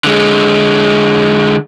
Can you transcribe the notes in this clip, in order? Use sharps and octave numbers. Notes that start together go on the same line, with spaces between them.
D3 G#3